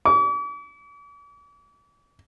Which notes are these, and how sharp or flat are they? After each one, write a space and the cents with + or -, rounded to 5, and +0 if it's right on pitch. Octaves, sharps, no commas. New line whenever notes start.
D6 -45